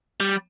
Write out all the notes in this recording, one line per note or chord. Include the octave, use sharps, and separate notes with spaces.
G3